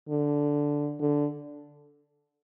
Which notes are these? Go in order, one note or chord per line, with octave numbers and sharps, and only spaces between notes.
D3
D3